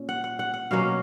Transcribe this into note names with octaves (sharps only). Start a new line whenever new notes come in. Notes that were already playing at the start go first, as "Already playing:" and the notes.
Already playing: A#2 C#4
F#5
F#5
F#5
F#5
B2 F#3 A#3 C#4 F5